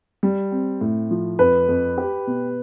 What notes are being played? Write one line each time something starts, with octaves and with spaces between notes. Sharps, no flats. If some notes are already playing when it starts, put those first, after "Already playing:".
G3
C4
A2
F3
F2 B4
F2
G4
B2